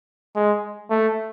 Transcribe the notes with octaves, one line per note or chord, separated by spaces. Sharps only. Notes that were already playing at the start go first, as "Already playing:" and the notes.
G#3
A3